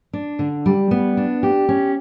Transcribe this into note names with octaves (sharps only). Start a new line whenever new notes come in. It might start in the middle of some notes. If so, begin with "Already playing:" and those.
D4
D3
G3
B3
D4
G4
C#4